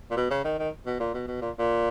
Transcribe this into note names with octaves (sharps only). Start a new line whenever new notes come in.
A#2
B2
C#3
D#3
D#3
B2
A#2
B2
B2
A#2
A#2